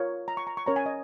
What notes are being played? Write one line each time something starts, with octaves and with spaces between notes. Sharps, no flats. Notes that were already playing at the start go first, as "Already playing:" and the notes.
Already playing: F4 A#4 C#5
A#5
C#6
A#5
C#6
C#4 A#4 C#5 A#5
G#5
D#5